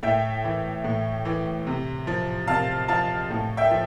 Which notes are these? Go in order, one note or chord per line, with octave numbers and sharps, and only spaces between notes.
A2 E5 G5
E3
A2
E3
C3
F3
C3 F5 A5
F3 F5 A5
A2
E5 G5
F3